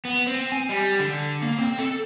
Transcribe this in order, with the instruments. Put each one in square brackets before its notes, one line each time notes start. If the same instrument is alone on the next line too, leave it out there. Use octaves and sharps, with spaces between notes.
[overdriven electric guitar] B3
C4
G#5
G3
D3
A#3
C4
A4